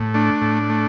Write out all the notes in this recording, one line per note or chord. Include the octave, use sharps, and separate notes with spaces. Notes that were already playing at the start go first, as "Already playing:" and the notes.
Already playing: A2
A3 D4
A2
A3